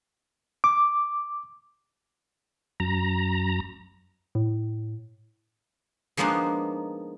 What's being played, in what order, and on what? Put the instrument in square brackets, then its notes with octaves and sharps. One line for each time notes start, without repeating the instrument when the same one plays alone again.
[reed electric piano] D6
[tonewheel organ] F#2 A#5
[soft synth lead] A2
[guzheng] F3 G#3 A#3 B3 D4 D#4